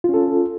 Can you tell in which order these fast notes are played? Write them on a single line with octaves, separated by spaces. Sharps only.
F4 C#4 A4